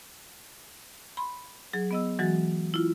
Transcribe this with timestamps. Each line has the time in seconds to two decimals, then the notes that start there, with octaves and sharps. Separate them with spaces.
1.17 B5 C6
1.73 F#3 G#4
1.91 B3 D#5 E6
2.19 E3 F#3 G#3 F#4 A6
2.74 E4 F4